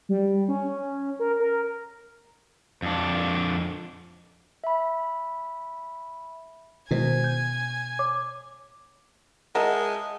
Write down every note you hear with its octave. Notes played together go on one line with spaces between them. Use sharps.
G3
C#4
A#4
A#4
F2 D4
E5 B5
B2 D#3 G#3 E4 C5 G#5
G6
C#5 D6
G#3 A#4 D#5 E5 F#5 A5